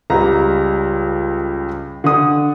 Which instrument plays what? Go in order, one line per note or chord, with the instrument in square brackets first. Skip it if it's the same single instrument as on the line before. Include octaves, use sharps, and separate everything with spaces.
[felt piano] C#2 G3 [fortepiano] A#5
[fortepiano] D3 D#6